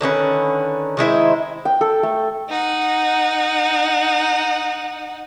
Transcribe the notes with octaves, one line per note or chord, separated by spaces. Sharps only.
D3 D#3 C#4 B4
D#3 G#3 E4 C5
G5
A4
A3
D#4 F#5